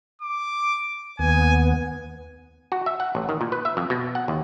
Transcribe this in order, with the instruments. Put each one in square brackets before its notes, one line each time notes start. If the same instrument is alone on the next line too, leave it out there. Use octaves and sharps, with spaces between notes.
[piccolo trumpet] D6
[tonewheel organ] D#2 B3 [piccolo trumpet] G#5
[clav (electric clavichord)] F#4
E5
F#5
A1
D#3
A#2
B4
E5
F2
B2
F#5
D#2